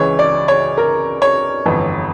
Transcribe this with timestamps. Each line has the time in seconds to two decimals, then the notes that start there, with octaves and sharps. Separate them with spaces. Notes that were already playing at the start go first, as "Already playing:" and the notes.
Already playing: C#2 C#3 E3 C#5
0.19 D5
0.48 C#5
0.78 A#4
1.22 C#5
1.66 G1 F2 E3